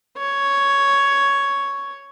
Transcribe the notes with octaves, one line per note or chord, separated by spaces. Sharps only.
C#5